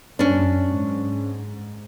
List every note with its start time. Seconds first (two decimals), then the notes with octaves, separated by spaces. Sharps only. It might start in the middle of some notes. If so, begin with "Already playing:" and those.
0.19 F#2 C#4 D4
0.70 G#2